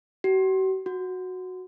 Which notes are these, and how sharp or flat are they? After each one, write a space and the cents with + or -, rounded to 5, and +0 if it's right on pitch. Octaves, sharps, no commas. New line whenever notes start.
F#4 +45
F#4 -10